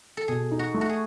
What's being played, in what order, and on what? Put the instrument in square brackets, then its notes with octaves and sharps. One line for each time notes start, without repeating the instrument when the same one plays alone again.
[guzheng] A4
[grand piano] B2 [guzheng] G#4
[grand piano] D#4
[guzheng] F#4
[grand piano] A3
[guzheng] F#4
G#4